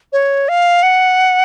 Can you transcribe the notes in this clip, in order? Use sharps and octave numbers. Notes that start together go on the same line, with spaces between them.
C#5
F5
F#5